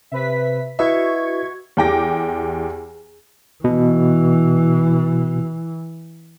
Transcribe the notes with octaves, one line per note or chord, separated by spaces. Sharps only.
C3 B4 E5 B6
E4 F#4 B4 D#5 E5 C#6 G#6
E2 G4 G5 D6 A#6
B2 E3